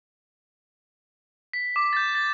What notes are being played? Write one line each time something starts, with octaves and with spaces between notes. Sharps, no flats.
B6
D6
G6 A6
A6